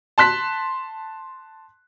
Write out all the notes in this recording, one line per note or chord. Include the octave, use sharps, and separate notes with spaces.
A5 C6 F#6 B6